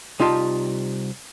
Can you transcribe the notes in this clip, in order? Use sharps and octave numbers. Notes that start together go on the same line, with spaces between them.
C2 D#4 F4 G4 A5